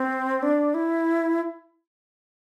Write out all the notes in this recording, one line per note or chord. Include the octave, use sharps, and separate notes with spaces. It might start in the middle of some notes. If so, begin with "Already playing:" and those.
Already playing: C4
D4
E4